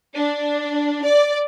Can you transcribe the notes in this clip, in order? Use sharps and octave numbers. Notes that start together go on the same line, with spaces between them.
D4
D5